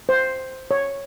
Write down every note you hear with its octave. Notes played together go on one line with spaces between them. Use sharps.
C5
C#5